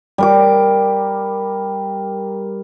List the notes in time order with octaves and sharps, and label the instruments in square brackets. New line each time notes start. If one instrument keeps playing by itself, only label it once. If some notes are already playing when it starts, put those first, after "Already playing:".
[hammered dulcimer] G3 A#4 D6